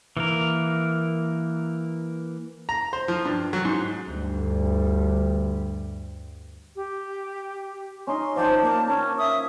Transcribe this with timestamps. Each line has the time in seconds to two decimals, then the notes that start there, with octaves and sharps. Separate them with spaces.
0.17 E3 A#3 A#4
2.69 A#5
2.93 C5
3.08 F3
3.25 G2
3.53 F#3
3.65 G#2
4.07 D2 G2 G3
6.76 G4
8.07 C#4 D#4 D#5 C6
8.36 F3 C5 D5 G5 A5
8.62 A#3
8.87 C#4 A#4 C#6
9.18 E5 D#6